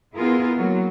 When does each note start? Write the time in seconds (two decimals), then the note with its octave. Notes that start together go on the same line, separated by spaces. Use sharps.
0.15 B3 E4 F4 G#4 A#4
0.56 F#3 A#3